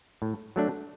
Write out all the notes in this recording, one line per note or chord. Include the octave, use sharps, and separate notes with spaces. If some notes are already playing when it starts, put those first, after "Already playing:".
A2
F#3 A3 D4